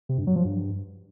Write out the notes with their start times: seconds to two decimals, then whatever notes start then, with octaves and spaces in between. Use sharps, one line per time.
0.09 C3
0.18 G2
0.27 F#3
0.36 F3
0.45 G2